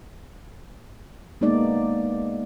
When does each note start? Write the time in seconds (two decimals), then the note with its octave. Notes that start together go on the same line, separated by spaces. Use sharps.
1.41 G#3 A#3 B3 D#4 D5